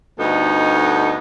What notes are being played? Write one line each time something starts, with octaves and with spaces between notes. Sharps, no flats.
D2 G2 B3 D#4 A4 D#5